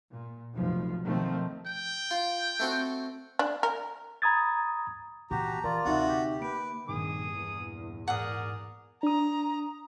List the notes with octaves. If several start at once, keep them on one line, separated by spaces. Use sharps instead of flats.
A#2
F1 B1 F3
B2 D#3 F3 A3 C4
G5
F4
A3 C4 F#4
D4
A#4
A#5 B5 D#6 G#6 A6
A#2 E3 F#4 G4 A#5
A5
E3 F4 A#4 D5
D2 C3 C4 D#4 F#4 E5
G4
A#3 B4 D7
A#1 G2 D#3 C4 G#4 D#6
E2 A#2
G#2 G#4 A#4 D5 F#5 D#6
D4 A#5 D#6